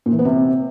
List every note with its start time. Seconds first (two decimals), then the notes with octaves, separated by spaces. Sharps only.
0.06 A#2
0.12 E3
0.19 B3
0.25 C3